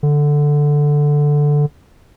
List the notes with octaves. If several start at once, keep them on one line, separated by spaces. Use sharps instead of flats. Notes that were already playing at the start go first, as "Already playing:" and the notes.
D3